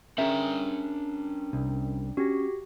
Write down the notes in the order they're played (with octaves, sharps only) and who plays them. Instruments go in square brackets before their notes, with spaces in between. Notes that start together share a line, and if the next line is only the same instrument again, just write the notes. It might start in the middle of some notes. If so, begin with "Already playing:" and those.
[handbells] C#4 A#4 [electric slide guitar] D4 G5 A#5 [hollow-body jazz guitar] G#4 E5
[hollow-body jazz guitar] C2
[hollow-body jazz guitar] C#4 [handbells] F#4 G4 A#6